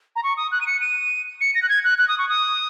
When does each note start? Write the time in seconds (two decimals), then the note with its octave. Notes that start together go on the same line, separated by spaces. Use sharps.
0.16 A#5
0.23 C#6
0.37 D#6
0.52 F#6
0.61 D#7
0.67 C#7
0.81 D#7
1.41 C#7
1.55 A#6
1.62 F#6
1.69 G#6
1.84 F#6
1.98 F#6
2.08 D#6
2.18 C#6
2.29 D#6